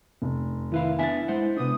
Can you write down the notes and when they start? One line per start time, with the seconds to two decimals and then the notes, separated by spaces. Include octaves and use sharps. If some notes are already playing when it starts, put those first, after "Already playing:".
0.22 F1
0.72 D#3 E4 B4 F5
0.99 B3 D4 E5 G#5 A6
1.28 G#3 C5 F#5
1.57 C3 B3 D4 E4 D#6